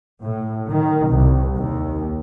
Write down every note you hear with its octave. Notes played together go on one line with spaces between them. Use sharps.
A2
D#3
C2
D#2